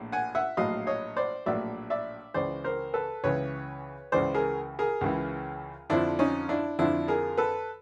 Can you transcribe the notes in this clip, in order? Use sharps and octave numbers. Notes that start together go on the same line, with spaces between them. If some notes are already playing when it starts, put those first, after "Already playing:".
Already playing: A#1 A2
F#5 G#5
E5 F#5
A#1 A2 F#3 D#5 F5
C#5 D#5
C5 D5
A#1 A2 F#3 D5 E5
D5 E5
C#2 C#3 E3 C5 D5
A#4 C5
A4 B4
C#2 C#3 E3 B4 C#5
C#2 C#3 E3 C5 D5
G#4 A#4
G#4 A#4
C#2 C#3 E3
F2 D3 F3 D4 E4
C#4 D#4
D4 E4
F2 D3 F3 D4 E4
G#4 A#4
A4 B4